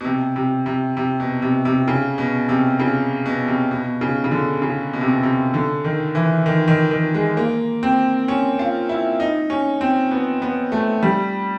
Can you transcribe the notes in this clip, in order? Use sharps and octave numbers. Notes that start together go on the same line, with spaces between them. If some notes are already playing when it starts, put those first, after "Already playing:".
B2
C3
C3
C3
C3
B2
C3
C3
C#3
B2
C3
C#3
B2
C3
B2
C#3
C#3
D3
C#3
B2
C3
B2
C3
D3
D#3
E3
D#3
D#3
D#3
G#3
A#3
C4
C#4
F4
E4
D#4
C#4
C4
B3
B3
A3
G3